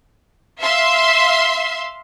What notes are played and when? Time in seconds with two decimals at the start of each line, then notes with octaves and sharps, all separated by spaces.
0.62 E5 F5 C6